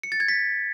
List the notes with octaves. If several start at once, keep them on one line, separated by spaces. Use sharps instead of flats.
C#7
A6
G#6
B6